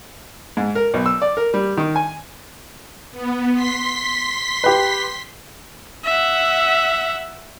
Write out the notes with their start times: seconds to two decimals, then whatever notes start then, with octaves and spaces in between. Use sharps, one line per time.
0.57 G#2
0.75 A#4
0.94 B1
1.06 E6
1.22 D5
1.37 A#4
1.54 G3
1.77 D#3
1.96 G#5
3.12 B3
3.53 C6 B6
4.64 G4 B4
6.04 E5 F#5